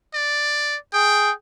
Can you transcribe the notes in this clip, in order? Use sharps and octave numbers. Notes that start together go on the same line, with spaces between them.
D5
G#4 G5